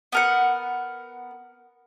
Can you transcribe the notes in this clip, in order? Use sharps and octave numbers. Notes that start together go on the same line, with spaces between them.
B3 A#4 F#5